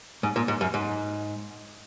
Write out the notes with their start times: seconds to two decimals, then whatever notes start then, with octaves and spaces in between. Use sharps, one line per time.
0.23 G#2
0.36 A#2
0.48 G#2
0.61 F#2
0.74 G#2